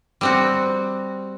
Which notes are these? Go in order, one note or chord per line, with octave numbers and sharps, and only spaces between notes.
G3 C4 F#4